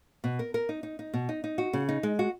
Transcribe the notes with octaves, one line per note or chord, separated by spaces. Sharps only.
B2
A#4
A#4
D#4
D#4
D#4
B2
D#4
D#4
F#4
C#3
D#4
G#3
F#4